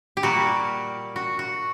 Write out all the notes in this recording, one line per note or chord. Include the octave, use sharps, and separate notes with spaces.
G4
A#2 G3 A#3 F#4
F#4
F#4